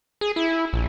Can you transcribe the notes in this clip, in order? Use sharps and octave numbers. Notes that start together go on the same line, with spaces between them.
G#4
E4
A#1